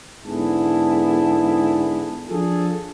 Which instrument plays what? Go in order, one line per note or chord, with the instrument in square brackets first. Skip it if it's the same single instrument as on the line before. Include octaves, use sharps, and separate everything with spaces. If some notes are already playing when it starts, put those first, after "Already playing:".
[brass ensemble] G#2 D3 B3 E4 G#4 A5
F3 D4 F4 G#4 A4